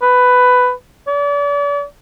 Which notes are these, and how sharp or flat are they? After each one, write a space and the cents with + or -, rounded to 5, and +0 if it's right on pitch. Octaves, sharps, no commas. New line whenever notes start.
B4 +10
D5 -40